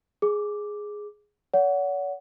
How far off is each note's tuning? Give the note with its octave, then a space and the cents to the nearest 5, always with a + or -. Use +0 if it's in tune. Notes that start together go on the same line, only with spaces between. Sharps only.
G#4 +0 D6 +0
C#5 +45 F#5 +0